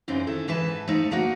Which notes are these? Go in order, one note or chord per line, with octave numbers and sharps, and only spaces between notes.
F#2 C#3 E3 C4 D#4
D#3 E4 A4
G#2 E3 B4 A5
F3 A3 D#4
D3 A#3 D#4 F#4